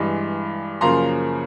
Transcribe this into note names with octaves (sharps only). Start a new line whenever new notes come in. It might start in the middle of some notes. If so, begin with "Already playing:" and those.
Already playing: G2 E3 G#3
F#2 C#3 F3 A#3 A#5 C6